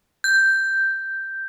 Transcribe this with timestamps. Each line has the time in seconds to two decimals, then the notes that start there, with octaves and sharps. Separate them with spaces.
0.24 G6